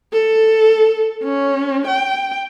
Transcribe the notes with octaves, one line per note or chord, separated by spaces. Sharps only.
A4
C#4
G5